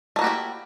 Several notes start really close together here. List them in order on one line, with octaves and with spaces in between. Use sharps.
A3 A#3 F#4 G4 E4